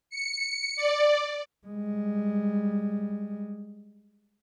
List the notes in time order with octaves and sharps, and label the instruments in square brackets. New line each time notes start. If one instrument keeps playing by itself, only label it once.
[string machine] C#7
D5
[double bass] G3 G#3